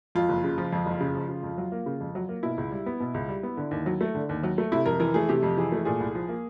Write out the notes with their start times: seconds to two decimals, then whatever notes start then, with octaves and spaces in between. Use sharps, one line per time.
0.15 F2 F4
0.29 F#1
0.44 C#3
0.58 F3
0.72 F2
0.86 F#1
1.00 C#3
1.15 F3
1.29 C#3
1.43 F2
1.58 F#3
1.72 A#3
1.86 C#3
2.00 F2
2.15 F#3
2.29 A#3
2.43 B2 E4
2.58 C#2
2.71 G3
2.86 B3
3.00 B2
3.14 C#2
3.28 G3
3.43 B3
3.57 D3
3.71 D#2
3.86 F#3
4.01 A3
4.15 D3
4.29 D#2
4.43 F#3
4.58 A3
4.72 C3 E4
4.86 F2 A#4
5.00 E3 A#4
5.14 A3 G#4
5.29 C3 G4
5.43 F2
5.57 E3 G#4
5.72 A3
5.85 A#2 G#4
6.00 C2
6.15 F3
6.29 A#3